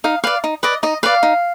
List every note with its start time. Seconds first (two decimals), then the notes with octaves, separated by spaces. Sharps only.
0.04 D#4 F5
0.24 B4 D5 F5
0.44 D#4
0.63 B4 D5 D#5
0.83 D#4 D#5
1.03 B4 D5 F5
1.23 D#4